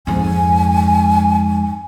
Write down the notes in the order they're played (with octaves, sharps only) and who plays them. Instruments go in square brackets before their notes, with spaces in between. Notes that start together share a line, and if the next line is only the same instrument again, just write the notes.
[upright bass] F2 G#2 [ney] G#5